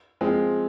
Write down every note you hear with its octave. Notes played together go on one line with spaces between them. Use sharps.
F3 G#3 C4